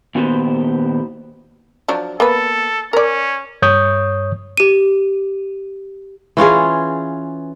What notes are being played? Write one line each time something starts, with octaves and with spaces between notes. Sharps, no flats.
A#2 D#3 B3 F#4 G4 C5
F3 F#3 D4
A#3 B3 A4 B4
C#4 A#4 D5
G2 C#5 C#6 D#6 G6
G4 D#7
E3 C#4 F4 G#4